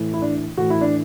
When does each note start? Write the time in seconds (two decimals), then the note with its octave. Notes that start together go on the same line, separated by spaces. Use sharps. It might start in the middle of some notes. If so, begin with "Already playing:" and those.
Already playing: A2 E3
0.13 E4
0.22 D4
0.57 A2 E3 F#4
0.70 E4
0.81 D4